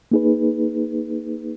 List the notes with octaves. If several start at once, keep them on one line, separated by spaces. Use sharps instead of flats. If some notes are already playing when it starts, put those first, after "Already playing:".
A#3 D#4 G#4 B4